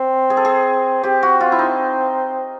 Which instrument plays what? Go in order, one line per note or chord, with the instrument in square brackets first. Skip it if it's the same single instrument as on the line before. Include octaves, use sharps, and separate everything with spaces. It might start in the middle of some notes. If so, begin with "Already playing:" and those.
Already playing: [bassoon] C4
[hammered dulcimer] G#4
A4
G#4
[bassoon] C4 [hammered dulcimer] G4
[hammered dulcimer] F#4
F4
E4
D#4